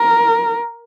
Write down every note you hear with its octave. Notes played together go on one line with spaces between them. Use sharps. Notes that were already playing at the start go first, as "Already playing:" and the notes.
Already playing: A#4